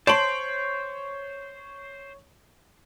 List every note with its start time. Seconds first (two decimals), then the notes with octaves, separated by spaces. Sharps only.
0.07 C5 C#5 A5 C6 D7 F#7